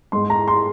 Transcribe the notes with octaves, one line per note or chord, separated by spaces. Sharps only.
G#2 G#3 C6
A#5
C6